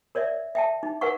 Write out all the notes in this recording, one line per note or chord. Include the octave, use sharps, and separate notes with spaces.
A#4 C#5 D5 E5
E5 G5 A5
D#4
A#4 B4 F5 F#5 C#6